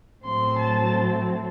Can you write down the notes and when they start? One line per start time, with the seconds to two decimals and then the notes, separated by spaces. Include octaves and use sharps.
0.25 A2 F#3 C4 C6
0.59 A5